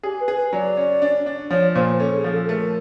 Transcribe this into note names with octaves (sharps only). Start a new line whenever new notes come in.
G4 G#4
B4
G#4
B4
F#3 D5
C#4
D4
D4
F3 C#5
A#2 C5
C#4 A4
G#4
F3
A4
A3 A#4